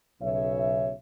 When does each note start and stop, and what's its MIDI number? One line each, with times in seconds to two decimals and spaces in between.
0.21 0.92 35
0.21 0.92 49
0.21 0.92 73
0.21 0.92 76